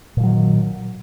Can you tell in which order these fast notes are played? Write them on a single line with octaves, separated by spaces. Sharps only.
A#2 F3 F#3 D#3